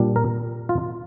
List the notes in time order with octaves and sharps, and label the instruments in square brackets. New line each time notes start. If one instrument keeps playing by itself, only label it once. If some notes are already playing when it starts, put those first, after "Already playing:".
Already playing: [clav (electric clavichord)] A#2 G3 D4
A#4
F4